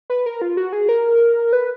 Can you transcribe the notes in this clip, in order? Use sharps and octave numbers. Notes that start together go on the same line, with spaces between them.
B4
A#4
F4
F#4
G#4
A#4
B4